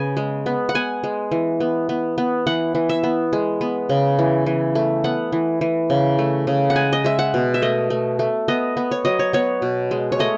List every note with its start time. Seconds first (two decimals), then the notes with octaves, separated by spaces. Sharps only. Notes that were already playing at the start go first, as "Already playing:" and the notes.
Already playing: C#3 B3 G#5
0.17 G#3
0.46 B3
0.69 F#5
0.75 B3 G#5
1.04 G#3
1.32 E3
1.60 B3
1.89 B3
2.18 B3
2.47 E3 F#5
2.75 E3
2.89 E5
3.03 B3
3.33 G#3
3.61 B3
3.89 C#3
4.19 E3
4.46 E3
4.75 A3
5.04 B3 F#5
5.33 E3
5.61 E3
5.90 C#3
6.19 A3
6.47 C#3
6.70 F#5
6.75 G#3 G#5
6.93 D#5
7.04 G#3 E5
7.19 F#5
7.34 B2
7.54 E5
7.62 A3 D#5
7.90 A3
8.19 A3
8.48 B3 D#5
8.77 B3
8.91 C#5
9.05 F#3 D#5
9.19 C#5
9.33 B3 C#5
9.62 B2
9.91 G#3
10.12 C#5
10.19 A3 D#5